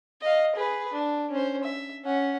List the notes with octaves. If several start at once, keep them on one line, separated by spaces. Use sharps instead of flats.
D#5 F5
G#4 B4
D4
C#4 C5
E5
C#4 F#5